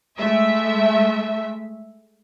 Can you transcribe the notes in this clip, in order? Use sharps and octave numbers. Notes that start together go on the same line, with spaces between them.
G#3 A3 E5